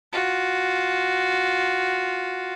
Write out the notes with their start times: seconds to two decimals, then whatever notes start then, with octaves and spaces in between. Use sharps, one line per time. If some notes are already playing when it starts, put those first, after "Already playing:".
0.13 F4 F#4